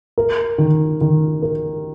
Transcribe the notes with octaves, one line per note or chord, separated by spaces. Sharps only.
A#4
D#3
D#3
A#4